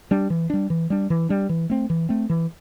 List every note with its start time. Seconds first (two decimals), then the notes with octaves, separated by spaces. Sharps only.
0.11 G3 D4
0.30 E3
0.50 G3 D4
0.70 E3
0.90 G3 D4
1.10 E3
1.29 G3 D4
1.49 E3
1.70 A3 C4
1.90 E3
2.09 A3 C4
2.29 E3